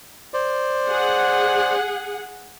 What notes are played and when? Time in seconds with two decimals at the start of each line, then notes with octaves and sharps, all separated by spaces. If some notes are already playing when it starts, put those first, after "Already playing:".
0.34 C5 D5
0.88 G#4 F#5